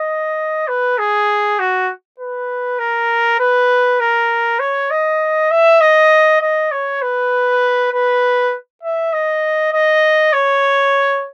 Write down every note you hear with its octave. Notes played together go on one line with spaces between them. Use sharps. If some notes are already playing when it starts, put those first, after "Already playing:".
Already playing: D#5
B4
G#4
F#4
B4
A#4
B4
A#4
C#5
D#5
E5
D#5
D#5
C#5
B4
B4
E5
D#5
D#5
C#5